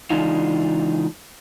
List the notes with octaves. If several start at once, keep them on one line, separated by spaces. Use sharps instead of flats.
C#3 E3 G#3 D4 D#4 F4